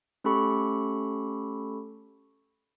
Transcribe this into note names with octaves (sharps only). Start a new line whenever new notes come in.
A3 C#4 G4 A4 B5 C#6